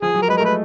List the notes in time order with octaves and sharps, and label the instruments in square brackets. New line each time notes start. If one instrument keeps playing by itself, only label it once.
[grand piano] F3 [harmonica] G#4
[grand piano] F#3
[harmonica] A#4
[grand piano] G#3 [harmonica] B4
[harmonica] A#4
[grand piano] A3 [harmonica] B4